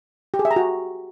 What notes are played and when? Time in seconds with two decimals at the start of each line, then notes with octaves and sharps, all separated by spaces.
0.34 G4
0.39 G#4
0.45 E5
0.51 A#5
0.56 F#4